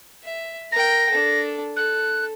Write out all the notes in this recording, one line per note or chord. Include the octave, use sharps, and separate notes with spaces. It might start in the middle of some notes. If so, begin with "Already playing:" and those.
E5
A#4 G5 A#6
D4 A4
A4 F#6